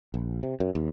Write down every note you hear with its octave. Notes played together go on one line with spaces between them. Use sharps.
A#1
C3
F#2
D#2